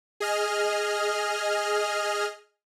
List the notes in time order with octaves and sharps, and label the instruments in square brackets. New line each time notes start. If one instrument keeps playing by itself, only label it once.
[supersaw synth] G#4 D#5 F6